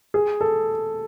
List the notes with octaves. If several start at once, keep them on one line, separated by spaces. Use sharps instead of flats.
G#4
A4